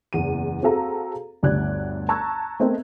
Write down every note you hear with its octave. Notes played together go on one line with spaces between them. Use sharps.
F#1 E2 D#7
C4 F#4 G#4 A4 F5 A#5
G1 D2 G4 D5 F#6 G#6
A5 A#5 C#6 E6 F#6 G#6
A3 B3 C4 A#4 D#5